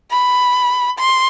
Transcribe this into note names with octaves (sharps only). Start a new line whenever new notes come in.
B5
C6